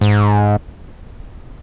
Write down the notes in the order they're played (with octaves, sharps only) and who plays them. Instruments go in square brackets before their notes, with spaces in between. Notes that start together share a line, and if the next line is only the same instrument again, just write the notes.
[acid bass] G#2